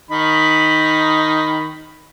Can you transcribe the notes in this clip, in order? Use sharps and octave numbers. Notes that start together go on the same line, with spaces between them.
D#3 D#4 B5